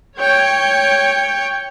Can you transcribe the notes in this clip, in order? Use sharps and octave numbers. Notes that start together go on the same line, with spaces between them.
C#5 G5